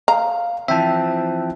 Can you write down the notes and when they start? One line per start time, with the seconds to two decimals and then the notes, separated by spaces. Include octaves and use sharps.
0.08 F5 A#5
0.68 E3 F3 C4 E5 G5 A5